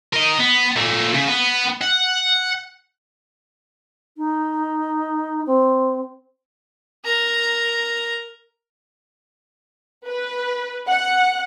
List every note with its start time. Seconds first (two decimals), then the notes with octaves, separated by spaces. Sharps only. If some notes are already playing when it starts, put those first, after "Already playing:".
0.13 A#4 D#5
0.39 B3
0.76 A#2 A3
1.15 C#3
1.28 B3
1.82 F#5
4.17 D#4
5.46 C4
7.05 A#4 A#5
10.06 B4
10.88 F#5